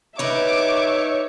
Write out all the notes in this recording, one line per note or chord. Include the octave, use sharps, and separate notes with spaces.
D#4 B4 C#5 E5 D6